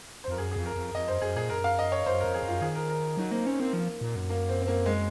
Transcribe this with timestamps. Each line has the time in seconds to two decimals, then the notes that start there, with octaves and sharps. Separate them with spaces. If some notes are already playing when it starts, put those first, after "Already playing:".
0.24 C5
0.28 F2 A#4
0.38 F#2 G#4
0.52 F2 G#4
0.66 A#4
0.76 F2
0.95 F2 D#5
1.08 F#2 C5
1.22 F#2 G#4
1.36 A#2 G#4
1.50 F#2 A#4
1.64 F5
1.79 D#5
1.92 C#5
2.06 F#2 C5
2.20 F2 A#4
2.34 G#4
2.43 F#2 F4
2.62 D#3 G#4
2.75 A#4
2.90 A#4
3.17 F#3 D#4
3.31 A#3 C4
3.46 C4 C#4
3.60 A#3 C4
3.73 F3
4.01 A#2
4.16 F#2
4.30 A#3
4.49 C4
4.62 C4
4.68 A#3
4.86 G#3